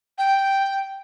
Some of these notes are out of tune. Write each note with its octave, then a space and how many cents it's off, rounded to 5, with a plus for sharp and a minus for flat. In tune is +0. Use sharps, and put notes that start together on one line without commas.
G5 +0